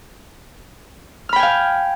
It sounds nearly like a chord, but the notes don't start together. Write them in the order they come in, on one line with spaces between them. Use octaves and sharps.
F6 B5 G5 G#5 F5